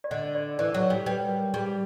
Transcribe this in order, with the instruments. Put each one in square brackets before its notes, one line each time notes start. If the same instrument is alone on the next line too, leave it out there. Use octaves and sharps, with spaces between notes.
[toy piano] D5
[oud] D3 [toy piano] D#5
[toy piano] D5
[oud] E3 [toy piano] D5
[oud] F#3
[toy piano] C#5
[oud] G3
[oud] G3 [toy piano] B4
[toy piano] A#4
[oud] G3 [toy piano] G#4